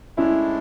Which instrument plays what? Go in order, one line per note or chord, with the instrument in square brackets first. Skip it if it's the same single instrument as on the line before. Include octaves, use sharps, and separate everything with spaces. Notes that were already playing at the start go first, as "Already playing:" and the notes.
[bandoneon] A2 G#3 D4 [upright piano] C#4 E4